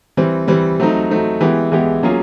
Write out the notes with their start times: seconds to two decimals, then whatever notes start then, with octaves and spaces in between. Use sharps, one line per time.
0.17 E3 G3 C4
0.48 E3 G3 C4
0.80 F#3 A3 C4 D#4
1.10 F#3 A3 C4 D#4
1.41 E3 G#3 B3 E4 G4
1.72 E3 G#3 B3 E4 G4
2.03 F#3 A#3 C#4 F4 G#4